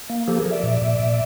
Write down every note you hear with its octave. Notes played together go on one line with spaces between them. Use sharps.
A#3
F3 G4 A4
G#4 A#4
F3
D5 E5
A#2
A#2
A#2